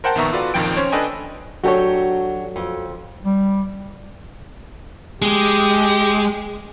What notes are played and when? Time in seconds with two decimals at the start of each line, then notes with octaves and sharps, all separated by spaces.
0.04 A#4 C5 F#5 G5 A5
0.16 A#1 D#3 B3 E5 A#5 C#6
0.33 F4 F#4 A4 B4 D5
0.54 A#1 F2 D#3 F3 G5 D7
0.77 C#4 C5 C#5
0.92 D4 A4 B4 D#5 G5 G#5
1.64 F#3 D4 F#4 G4 A4 C#5
2.56 F2
3.24 G3
5.22 G#3 G4